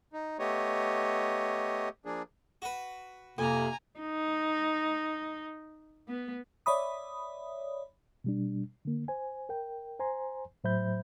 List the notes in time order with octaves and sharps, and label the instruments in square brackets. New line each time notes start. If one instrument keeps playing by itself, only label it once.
[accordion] D#4
A3 B3 G4 C#5 D#5
F3 A#3 D4 G#4
[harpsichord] F#4 B4
[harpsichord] F2 [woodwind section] C3 A#3 [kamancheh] G#5 A#5
[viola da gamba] D#4
B3
[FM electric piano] C#5 D5 E5 B5 D#6
[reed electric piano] B2 G3 D4
D3 A#3
C5 G#5
A#4 G5
C5 G#5 A#5 C6
A2 F#3 C5 E5 B5 G6